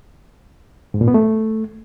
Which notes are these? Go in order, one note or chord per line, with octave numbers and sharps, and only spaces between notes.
G#2
A#2
B3
A3